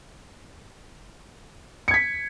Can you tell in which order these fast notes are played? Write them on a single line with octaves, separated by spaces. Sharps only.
C#7 G#6 B6